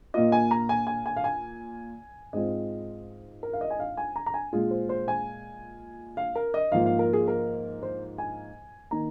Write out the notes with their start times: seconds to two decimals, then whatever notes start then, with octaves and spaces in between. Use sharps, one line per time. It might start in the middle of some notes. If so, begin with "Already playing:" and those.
0.14 A#2 A#3 F4 D#5
0.32 G#5
0.51 A#5
0.69 G#5
0.87 G#5
1.06 G#5
1.17 F5
1.24 G#5
2.33 G#2 G#3 C4 F4 D#5
3.43 A#4
3.53 F5
3.61 D#5
3.70 G#5
3.80 F5
3.97 G#5
4.16 A#5
4.26 A#5
4.34 G#5
4.53 A#2 G#3 F4 G#4
4.71 C5
4.89 C5
5.08 G#5
6.17 F5
6.36 A#4
6.54 D#5
6.72 G#2 F3 A#3 F4 F5
6.86 F5
6.99 A#4
7.13 G#4
7.28 A#4
7.83 C5
8.18 G#5
8.91 D#3 A#3 D#4 A#5